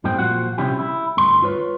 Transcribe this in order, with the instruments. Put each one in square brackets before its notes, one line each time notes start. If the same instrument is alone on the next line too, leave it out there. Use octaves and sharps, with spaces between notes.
[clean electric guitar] F#2 A2 G3 C4 G5
A#2 F3 G3 F4 F#4 F#5
C3 F3 G3 C#4 E4 G4
E4
D2 G2 C6
F4 B4 C#5